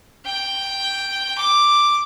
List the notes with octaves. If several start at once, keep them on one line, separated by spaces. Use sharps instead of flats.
G5
D6